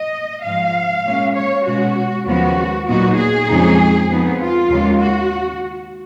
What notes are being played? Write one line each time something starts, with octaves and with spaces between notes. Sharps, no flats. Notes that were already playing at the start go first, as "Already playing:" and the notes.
Already playing: D#5
G#2 F3 G#3 F5
A#2 G#3 C#4
C#5
B2 G#3 C#4 F#4
D#2 C#3 F3 G#3 B3 F#4
A#2 F#3 B3 D#4 F#4
G#4
F2 C#3 G#3 D#4
F2 F3 B3 D#4
F4
D#2 C#3 G#3
F#4